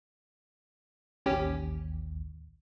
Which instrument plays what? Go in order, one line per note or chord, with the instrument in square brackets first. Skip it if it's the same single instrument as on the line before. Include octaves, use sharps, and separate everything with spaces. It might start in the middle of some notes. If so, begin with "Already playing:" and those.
[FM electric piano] A1 D#2 [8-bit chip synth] C#4 G4